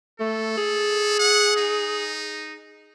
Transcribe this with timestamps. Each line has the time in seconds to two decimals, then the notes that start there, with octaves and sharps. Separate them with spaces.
0.20 A3 A4
0.57 G#4
1.19 F#5
1.57 D#4